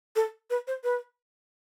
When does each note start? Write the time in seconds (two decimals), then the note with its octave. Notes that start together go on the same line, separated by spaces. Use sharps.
0.16 A4
0.50 B4
0.67 C5
0.84 B4